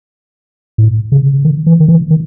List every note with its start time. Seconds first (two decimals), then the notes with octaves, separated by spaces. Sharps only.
0.78 A2
1.12 C#3
1.45 D#3
1.66 E3
1.80 D#3
1.88 E3
2.10 D#3